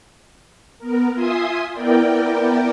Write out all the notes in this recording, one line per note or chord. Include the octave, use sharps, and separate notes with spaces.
B3 A#4
F4 E5 G#5 C6 D#6
B3 E4 A#4 D5 G5